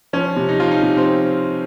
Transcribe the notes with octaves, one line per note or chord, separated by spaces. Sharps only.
F3 C#4
C3
D#4
F3 F4
D#4
C3
C4